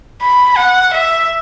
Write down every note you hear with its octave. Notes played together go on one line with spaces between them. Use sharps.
B5
F#5
E5